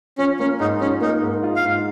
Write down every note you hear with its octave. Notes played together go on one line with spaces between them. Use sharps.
F3 C#4
A#3 C#4
G#2 D#4
F3 C#4
A#3 D#4
G#2
F4
F5
G#2